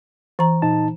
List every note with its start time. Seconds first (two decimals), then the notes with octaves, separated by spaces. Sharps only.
0.39 E3 A#5
0.62 A#2 D#4 A5